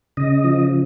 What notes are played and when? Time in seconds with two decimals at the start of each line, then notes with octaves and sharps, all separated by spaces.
0.17 C#3 D#5
0.44 F3